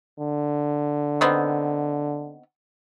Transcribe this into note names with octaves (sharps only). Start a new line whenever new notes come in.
D3
D#3 B3 C4